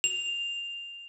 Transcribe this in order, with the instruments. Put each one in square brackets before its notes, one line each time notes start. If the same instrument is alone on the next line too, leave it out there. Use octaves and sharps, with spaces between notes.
[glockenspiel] F7